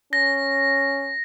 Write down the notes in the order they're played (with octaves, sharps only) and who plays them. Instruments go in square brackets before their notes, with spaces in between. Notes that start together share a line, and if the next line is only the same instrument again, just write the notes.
[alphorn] C#4 [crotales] A#6